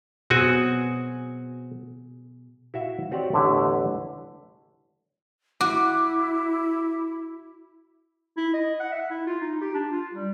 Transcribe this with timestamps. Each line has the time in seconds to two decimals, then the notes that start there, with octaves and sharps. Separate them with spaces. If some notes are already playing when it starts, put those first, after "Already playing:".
0.30 B2 C4 F#4 G#4 G#5
2.74 E4 F#4 E5 F5
3.11 C4 F#4 G4 C#5 D5
3.33 A1 E2 D3 A3 E4 D#5
5.61 E4 F#4 D6
8.37 E4
8.53 D#5
8.80 F#5
8.91 E5
9.10 E4
9.27 F4
9.41 D#4
9.61 G4
9.74 D4
9.91 F4
10.14 G3